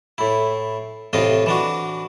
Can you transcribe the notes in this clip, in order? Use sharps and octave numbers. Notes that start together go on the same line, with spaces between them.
A2 E4
A1 A2 C3 F4 D#5
E3 D4 F#4